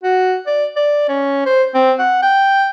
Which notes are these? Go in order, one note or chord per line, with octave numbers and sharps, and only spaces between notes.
F#4
D5
D5
C#4
C5
C4
F#5
G5